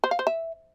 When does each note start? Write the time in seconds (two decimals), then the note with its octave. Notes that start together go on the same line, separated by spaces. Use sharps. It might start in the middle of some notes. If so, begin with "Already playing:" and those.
0.04 C5
0.11 F5
0.19 C5
0.27 E5